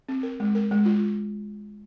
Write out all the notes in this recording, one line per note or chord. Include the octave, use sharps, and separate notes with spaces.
C4
A#4
G#3
A#4
G#3
F4